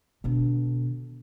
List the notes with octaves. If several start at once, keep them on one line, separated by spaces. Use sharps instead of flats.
B2 D3